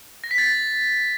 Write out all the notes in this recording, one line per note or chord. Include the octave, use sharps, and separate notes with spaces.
A#6
B6
A6